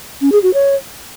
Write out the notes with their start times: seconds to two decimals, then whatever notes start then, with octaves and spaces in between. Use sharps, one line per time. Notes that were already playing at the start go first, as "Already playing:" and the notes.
0.21 C#4
0.32 G#4
0.43 F#4
0.54 C#5